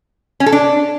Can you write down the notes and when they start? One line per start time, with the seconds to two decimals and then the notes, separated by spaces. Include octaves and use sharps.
0.40 C#4
0.46 A4
0.52 D4